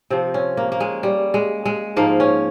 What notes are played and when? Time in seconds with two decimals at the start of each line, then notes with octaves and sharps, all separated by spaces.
0.10 C3 F3 C4
0.34 C#4
0.57 A#3
0.72 A#3
0.80 G#3
1.03 G3
1.34 G#3
1.65 G#3
1.96 G#2 F3 A#3
2.20 C#4